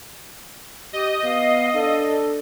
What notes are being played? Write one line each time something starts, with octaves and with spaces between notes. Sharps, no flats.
G4 D#5
B3 F5
D4 A4